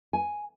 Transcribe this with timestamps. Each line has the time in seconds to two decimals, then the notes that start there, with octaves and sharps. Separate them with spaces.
0.13 G#5